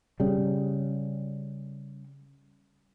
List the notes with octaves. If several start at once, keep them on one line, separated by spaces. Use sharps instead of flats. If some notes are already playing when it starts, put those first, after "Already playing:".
C#3 G3